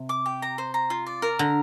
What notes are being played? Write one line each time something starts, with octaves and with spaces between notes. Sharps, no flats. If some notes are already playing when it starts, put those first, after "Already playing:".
Already playing: C3
D6
G4
A#5
C5
A#5
F4
D5
A#4
D3 A#5